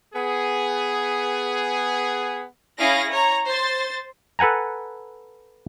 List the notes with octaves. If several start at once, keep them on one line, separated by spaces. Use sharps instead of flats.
B3 G#4
C#4 E4 G#4 F5 A#6
C#5 A#5
C5 A6
A4 B4 F#5 G#5 A#5